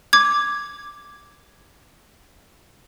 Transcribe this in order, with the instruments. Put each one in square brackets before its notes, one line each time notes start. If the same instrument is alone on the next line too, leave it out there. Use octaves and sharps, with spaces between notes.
[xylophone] D6 G#6